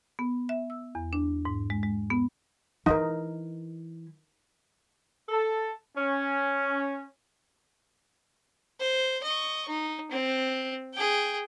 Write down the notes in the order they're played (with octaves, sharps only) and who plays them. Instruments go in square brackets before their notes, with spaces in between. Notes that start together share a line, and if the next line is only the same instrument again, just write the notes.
[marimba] B3
E5
E6
E2
D4
G#2
G#3
G#3
B3
[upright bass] E3 E4 [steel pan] D#4 A#4
[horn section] A4
C#4
[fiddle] C5
D#5 C#6
D#4
C4
G#4 G5